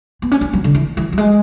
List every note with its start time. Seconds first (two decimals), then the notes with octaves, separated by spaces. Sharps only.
0.22 B3
0.31 C#4
0.41 D4
0.53 F#3
0.64 D3
0.75 E3
0.97 E3
1.12 F#3
1.18 G#3